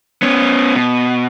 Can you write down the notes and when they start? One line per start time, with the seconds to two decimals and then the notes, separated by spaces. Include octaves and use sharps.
0.22 B3 C#4
0.75 B2